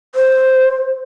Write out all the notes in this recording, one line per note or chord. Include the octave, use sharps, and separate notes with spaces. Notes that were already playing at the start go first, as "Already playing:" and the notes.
C5